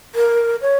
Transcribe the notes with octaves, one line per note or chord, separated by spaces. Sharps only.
A#4
C#5